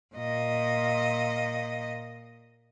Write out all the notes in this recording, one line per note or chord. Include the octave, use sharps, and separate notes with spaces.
A#2 D#5